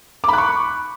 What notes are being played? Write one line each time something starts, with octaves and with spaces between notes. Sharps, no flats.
B5 C#6 D6 F#6